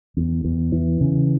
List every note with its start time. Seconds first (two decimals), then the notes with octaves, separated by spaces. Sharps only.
0.17 E2
0.44 E2
0.72 E3
1.01 C#3